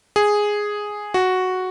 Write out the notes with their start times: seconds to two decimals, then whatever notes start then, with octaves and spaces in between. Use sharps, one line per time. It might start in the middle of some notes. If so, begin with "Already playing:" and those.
0.16 G#4
1.14 F#4